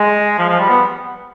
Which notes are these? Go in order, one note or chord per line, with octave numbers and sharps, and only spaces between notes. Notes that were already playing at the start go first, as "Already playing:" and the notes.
Already playing: G#3
F3
F3
G3
B3